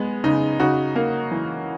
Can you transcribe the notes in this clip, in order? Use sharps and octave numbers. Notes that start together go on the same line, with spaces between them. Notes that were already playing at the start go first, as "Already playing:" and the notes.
Already playing: G#3 B3
C#3 D#4
C#3 D#4 F#4
A#3
E3